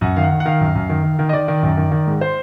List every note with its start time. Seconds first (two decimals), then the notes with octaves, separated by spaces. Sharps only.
0.01 F#2 F#5
0.16 D#3 F5
0.24 F#5
0.31 D#3
0.40 F#5
0.45 D#3 F5
0.61 F#2
0.75 F#2
0.89 D#3
1.04 D#3
1.19 D#3
1.29 D#5
1.33 D#3 D5
1.48 D#3
1.63 F#2
1.77 D#3
1.91 D#3
2.07 G#2
2.21 C5